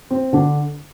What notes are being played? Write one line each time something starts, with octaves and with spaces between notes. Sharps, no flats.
C4
D3 D4